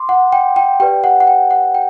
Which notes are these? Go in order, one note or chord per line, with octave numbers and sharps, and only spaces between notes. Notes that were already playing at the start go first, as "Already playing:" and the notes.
Already playing: C6 D6
F#5
G5
G5
G4 B4 D5 G5
F#5
F#5
G5
F#5
G5